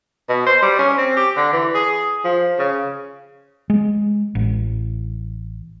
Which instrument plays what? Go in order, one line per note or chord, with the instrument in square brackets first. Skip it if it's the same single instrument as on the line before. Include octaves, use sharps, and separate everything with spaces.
[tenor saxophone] B2
C5
G3
C#4
C4
G4
D3
E3
G#4
F3
C#3
[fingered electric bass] G#3
A1